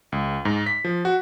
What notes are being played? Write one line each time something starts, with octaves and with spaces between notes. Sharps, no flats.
C#2
G#2
B6
F3
F#4